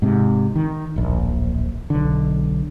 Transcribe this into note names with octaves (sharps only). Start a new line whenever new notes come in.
G#2 C3
D#3
D1 A#1
B1 D3